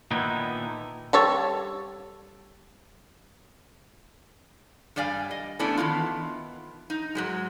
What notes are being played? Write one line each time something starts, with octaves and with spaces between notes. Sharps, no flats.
A#2 D3 D#3 B3 D#4 E4
G3 A4 C#5
G2 G3 D5 F5 G#5
D#5
A3 B3 C#4 D4 E4
D#3 E3 B3 F4
D#4
G#2 F#3 G#3